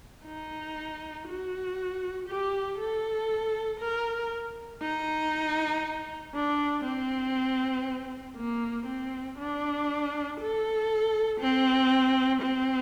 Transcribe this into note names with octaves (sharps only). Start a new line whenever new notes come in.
D#4
F#4
G4
A4
A#4
D#4
D4
C4
A#3
C4
D4
A4
C4
C4